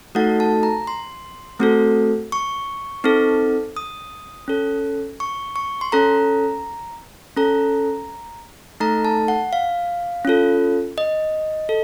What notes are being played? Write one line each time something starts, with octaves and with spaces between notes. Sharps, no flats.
A3 D#4 F#4 A4 F#5
A5
A#5
C6
A3 C4 F#4 A4
C#6
C4 D#4 A4
D#6
C#4 A4
C#6
C#6
C6
C#4 A4 A#5
C#4 A4 A#5
A3 D#4 A4 A#5
A5
F#5
F5
C#4 F4 A4
D#5
A4